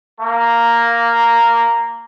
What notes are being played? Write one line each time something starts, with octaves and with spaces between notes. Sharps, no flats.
A#3